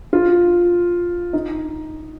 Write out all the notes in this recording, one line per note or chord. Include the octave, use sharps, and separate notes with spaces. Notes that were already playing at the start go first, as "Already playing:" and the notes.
F4
D#4